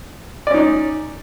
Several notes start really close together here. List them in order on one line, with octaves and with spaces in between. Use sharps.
D5 C#4 D#4